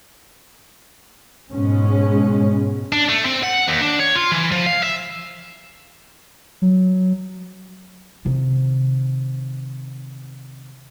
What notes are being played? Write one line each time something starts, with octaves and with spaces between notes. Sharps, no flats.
G#2 B2 G#3 C#4
D4
A3
C4
F#5
D#2
D4
C#5
F4
E3
F3
F5
E5
F#3
C3 D#3